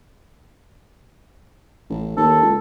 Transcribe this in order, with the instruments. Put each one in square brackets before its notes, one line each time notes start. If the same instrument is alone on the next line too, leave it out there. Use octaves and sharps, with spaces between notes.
[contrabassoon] A1
[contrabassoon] D#2 [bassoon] A4
[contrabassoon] C#2